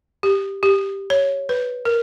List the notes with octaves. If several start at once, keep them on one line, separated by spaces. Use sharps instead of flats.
G4
G4
C#5
B4
A#4